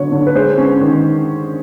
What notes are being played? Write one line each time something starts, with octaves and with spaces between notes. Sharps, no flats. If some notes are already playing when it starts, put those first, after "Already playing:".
Already playing: D3 F#3 B3 C#5
D3
B4
G#3 C5
C#4
D#3